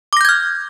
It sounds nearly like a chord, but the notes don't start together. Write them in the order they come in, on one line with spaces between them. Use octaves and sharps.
D6 A#6 G6 G#6 F6